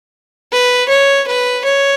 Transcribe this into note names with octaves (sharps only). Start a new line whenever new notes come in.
B4
C#5
B4
C#5